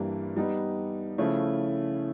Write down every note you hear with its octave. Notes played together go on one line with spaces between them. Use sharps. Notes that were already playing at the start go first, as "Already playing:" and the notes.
Already playing: G2 E3 G3 A#3 D4
G3 B3 D#4
C#3 F3 A3 C#4 E4